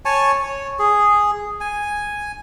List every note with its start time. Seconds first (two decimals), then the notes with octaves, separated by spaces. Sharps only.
0.05 C#5 G#5 A5 C#6
0.43 C#5
0.79 G#4
1.60 G#5